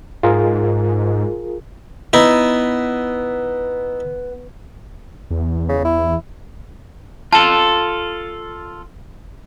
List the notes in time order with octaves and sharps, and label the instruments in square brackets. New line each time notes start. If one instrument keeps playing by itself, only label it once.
[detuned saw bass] G#2 [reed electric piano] F4 G#4 A#4
[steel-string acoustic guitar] B3 [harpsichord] D#4 E4
[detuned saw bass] E2
[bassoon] C#3
E4
[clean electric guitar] F4 A4 [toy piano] A5